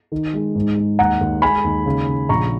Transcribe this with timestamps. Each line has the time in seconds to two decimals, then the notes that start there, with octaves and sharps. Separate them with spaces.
0.12 D#3
0.34 G#3
0.55 G#2
0.77 G#3
0.99 D#2 F#5 A#5
1.21 D#2
1.42 G#3 G#5 B5
1.64 D#2
1.86 C#3
2.08 C#3
2.29 A#1 A#5 C#6